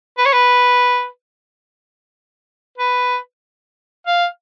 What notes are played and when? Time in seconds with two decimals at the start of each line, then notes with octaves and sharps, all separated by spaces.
0.18 B4
0.26 C#5
0.33 B4
2.78 B4
4.07 F5